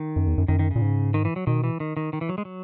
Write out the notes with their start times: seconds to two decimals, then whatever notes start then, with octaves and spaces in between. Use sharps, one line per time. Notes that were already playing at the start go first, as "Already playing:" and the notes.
Already playing: D#3
0.16 F#2
0.27 E2
0.38 F#2
0.48 F#2 D#3
0.59 D#3
0.71 A#2 C#3
0.82 G#2
1.14 D#3
1.25 E3
1.36 F#3
1.47 B2 D#3
1.64 E3
1.80 D#3
1.97 D#3
2.13 D#3
2.21 E3
2.29 F#3
2.38 G#3
2.45 F#3